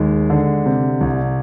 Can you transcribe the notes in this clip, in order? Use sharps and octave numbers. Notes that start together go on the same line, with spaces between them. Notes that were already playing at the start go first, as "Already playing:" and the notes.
Already playing: D#2 G#3
D3
C3
C2